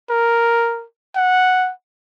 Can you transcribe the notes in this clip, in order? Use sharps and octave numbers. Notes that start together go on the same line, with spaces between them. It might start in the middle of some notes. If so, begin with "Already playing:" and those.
A#4
F#5